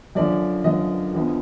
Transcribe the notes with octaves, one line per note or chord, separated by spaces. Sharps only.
F#2 D3 F3 D5
F#2 D3 F3 D#5
D2 D3 F3 B3